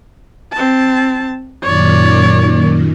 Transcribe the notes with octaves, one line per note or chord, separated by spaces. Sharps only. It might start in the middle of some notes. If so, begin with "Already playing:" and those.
C4 A5
F#2 A#2 D#3 C#5 D5